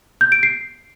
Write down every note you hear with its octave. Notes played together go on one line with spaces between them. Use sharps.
G6
D7
C7